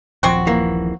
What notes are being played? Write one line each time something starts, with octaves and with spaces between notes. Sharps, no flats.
D#1 A#1 F3 F#3 C4 F#4
E3 A#3